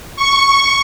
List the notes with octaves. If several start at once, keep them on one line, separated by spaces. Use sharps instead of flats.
C#6